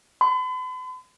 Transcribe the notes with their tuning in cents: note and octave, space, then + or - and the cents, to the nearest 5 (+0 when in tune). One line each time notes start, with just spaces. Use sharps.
B5 +45